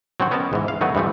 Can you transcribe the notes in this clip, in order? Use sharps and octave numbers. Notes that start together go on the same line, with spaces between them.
F#3 C4 D4 F#4
B3 C#4 A#4 D#5 A5
G#2 E3
F5
D#3 F#3 A3 B3 F#4 B4
G2 E3 F3 A3